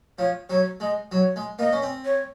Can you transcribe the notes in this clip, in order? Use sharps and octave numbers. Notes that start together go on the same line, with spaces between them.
F3 C#5
F#3 C#5
G#3 D#5
F#3 C#5
G#3
A#3 D#5
C#4
C4
C#5